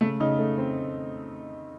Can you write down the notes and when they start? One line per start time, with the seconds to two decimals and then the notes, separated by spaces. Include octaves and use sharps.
0.01 C#3 A3
0.20 C#3 D#4
0.39 A3
0.58 C4